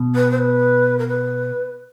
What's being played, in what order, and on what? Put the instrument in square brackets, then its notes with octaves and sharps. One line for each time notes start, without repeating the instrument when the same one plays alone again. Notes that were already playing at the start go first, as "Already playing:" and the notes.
Already playing: [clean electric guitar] B2
[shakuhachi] B4
C5
B4
A#4
B4